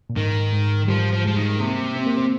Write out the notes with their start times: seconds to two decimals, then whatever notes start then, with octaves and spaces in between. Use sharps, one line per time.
0.10 A#2
0.16 G#2 D#3
0.53 G#2
0.88 F3 G3
1.12 F3
1.25 F3 G#3
1.36 D#3
1.60 C3 A#3
1.96 C4
2.06 A#3
2.17 C4